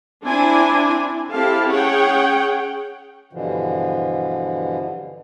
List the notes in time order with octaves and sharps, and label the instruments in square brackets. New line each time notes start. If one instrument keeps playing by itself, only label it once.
[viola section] C4 D4 E4 G#5
C4 E4 G4 A4 F5 A5
C#4 G#4 C#5 F#5 G5
[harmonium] G2 B2 D3 E3 F3